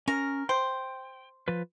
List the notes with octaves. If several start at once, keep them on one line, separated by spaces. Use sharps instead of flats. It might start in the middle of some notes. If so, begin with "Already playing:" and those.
C#4 A#4
C5 G5
F3 F4 B4